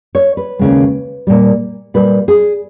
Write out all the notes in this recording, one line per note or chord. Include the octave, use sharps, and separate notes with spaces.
C#5
B4
D#2 C#3 G#3
A#2 G3
A#2 G3 B4
G#4